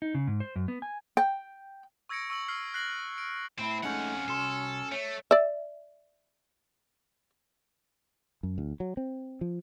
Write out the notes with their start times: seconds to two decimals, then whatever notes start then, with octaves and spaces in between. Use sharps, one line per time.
0.02 D#4
0.15 C#3
0.27 G#2
0.40 C5
0.56 F#2
0.68 B3
0.82 G#5
1.17 G5
2.09 C#6 E6 G#6 A#6 C#7 D7
2.30 C#6 E6 F#7
2.48 E6 F6 C7
2.74 F#6 A#6 C7 F#7
3.18 D7
3.58 A2 C4 E4
3.83 F2 G#3 A3 C#4 D#4 F#5
4.28 C2 F#4 A4 C6
4.92 A3 C#5
5.31 D5 E5
8.43 F#2
8.58 D2
8.80 F#3
8.97 C4
9.41 F3